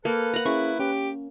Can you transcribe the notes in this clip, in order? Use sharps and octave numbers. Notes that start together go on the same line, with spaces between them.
A#3 A4 B4
F#5 A#5
C#4 E4 G#4 C#6
C#4 G4